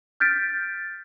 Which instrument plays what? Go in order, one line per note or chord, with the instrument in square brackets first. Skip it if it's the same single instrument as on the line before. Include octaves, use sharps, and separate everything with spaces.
[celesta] F6 G6 A6 B6 D7